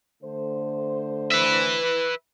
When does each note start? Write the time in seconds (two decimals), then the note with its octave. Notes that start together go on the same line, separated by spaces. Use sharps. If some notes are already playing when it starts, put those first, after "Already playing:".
0.23 D3 A3 C5
1.32 B4 E5